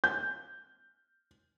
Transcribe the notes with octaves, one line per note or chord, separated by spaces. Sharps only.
G6